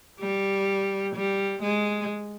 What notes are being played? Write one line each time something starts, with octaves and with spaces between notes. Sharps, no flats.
G3
G3
G#3